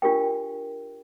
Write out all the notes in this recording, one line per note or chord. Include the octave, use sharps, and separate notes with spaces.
D4 F4 G4 A#4 G5